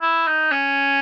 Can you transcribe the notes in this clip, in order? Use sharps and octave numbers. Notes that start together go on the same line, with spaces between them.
E4
D#4
C#4